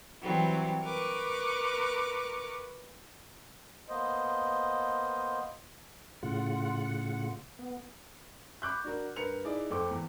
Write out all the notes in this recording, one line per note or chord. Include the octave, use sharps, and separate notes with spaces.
E3 F#3 G3 C4
A#4 B4 C#6 D6
A#3 B3 C5 D#5
A2 C#3 F4 F#5
B3
B5 C#6 D6 F#6 G6
D4 F#4 A#4
G2 A#4 B4 C#7 F7
D#4 E4 G#4 D5
F2 A4 C5 D6
E2